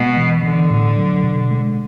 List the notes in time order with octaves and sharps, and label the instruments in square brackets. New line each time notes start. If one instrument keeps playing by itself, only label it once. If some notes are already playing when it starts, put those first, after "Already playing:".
Already playing: [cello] B2 [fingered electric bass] G#3
[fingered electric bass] E3
[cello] D3 [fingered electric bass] E3
[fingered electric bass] A2
F#3
B2
G#3